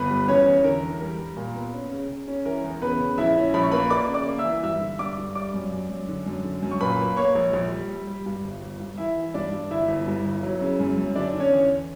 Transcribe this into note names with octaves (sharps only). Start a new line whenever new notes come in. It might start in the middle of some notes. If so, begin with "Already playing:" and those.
Already playing: G1 B3 B4
G3
E2 C#4 C#5
E2
D3 A#4
E2
G3 A#4
G3
A#2
B3
C#4
C#3
C#3
C#4
E3 A#4
E2
C#3 B3 B4
C#3
A#1 E4 E5
C#4
A#1 B5
C#6
A#3 B4 B5
A#3 D5 D6
C#3
D5 D6
A#3
E5 E6
E3
G2 E5 E6
D3
G2 D5 D6
G2
G3 D5 D6
F#2
F#2
F#2
D3
F#2
D3
F#2
C#6
A#2 B4 B5
A#3
A#3 C#5 C#6
A#1
A#1
G3
G3
G3
G2
G1
G1
G2
E3 E4 E5
E3
G2 D4 D5
G2
G1 E4 E5
G1
G2
G1
F#3
C#3
F#2
F#2
D3 D4 D5
D3
C#4 C#5
E2